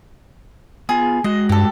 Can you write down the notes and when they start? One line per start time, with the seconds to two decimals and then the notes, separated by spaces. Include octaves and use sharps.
0.89 B3 F4 G#4
1.24 G#3 F#4 D#5
1.49 G2 G4 A4